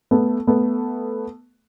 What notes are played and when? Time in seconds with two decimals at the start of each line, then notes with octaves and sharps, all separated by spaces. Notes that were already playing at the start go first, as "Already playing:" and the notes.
0.11 A3 B3
0.47 A3 B3